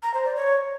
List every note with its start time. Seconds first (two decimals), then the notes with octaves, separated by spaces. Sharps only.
0.03 A#5
0.14 C5
0.25 D5
0.36 C#5